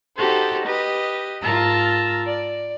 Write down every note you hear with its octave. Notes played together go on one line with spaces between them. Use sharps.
D#4 F#4 G4 A4 C5
G4 B4 D#5
G#2 F4 A#4 A5 A#5 E6
D5